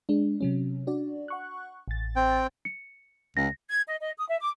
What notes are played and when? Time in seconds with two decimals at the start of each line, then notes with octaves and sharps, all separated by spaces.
0.09 G#3 D4
0.41 C3 F#3 C#4
0.87 D4 F#4 D5
1.28 F#5 C#6 F#6
1.88 A1 A6
2.16 C4 G5
2.65 C#7
3.37 C#2 A#6
3.69 G#6
3.88 D#5
4.01 D#5
4.18 D#6
4.29 E5
4.42 D6